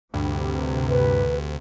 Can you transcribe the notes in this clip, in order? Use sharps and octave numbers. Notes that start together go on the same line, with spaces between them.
D2 G2 C3
B4